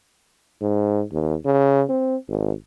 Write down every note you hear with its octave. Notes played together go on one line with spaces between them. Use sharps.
G#2
D#2
C#3
C4
G#1